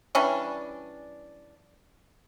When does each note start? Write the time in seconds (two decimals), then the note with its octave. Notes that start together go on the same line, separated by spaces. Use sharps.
0.15 E3 G3 C#4 D4